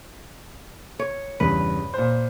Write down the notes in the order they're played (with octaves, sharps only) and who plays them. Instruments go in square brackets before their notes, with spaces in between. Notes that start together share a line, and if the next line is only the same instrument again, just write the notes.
[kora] C#5
[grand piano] E2 G2 C#3 [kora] B4
[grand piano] A#2 C5